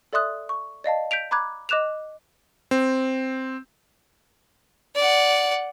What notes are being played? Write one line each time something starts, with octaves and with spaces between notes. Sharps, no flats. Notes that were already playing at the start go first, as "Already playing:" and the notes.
A4 D5 E5 C6 D#6 F#6
C#6
D5 D#5 F5 A5
G6 B6 D7 F7
A#5 B5 D6 F#6 G#6
D#5 D6 F#6 E7 F7
C4
D5 F#5